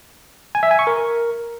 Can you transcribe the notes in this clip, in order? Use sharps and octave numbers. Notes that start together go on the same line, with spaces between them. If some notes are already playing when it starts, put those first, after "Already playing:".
G#5
E5
G#5
C#6
A#4